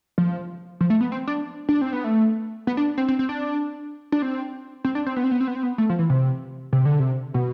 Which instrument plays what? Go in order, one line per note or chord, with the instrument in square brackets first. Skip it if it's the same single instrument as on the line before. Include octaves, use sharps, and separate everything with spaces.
[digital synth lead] F3
F3
A3
B3
C4
D4
D4
C4
B3
A3
B3
D4
C4
C4
C4
D4
D4
C4
C4
D4
C4
B3
C4
B3
C4
B3
C4
B3
A3
F3
E3
C3
C3
D3
C3
B2